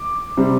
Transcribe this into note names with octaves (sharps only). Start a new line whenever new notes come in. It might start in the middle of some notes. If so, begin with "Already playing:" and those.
Already playing: D6
C3 G3 C4